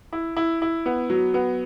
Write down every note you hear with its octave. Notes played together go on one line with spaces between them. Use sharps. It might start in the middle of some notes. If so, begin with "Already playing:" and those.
E4
E4
E4
B3
F#3
B3